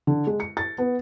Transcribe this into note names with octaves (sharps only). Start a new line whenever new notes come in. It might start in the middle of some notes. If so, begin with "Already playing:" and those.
D3
G#3
C#7
A6
B3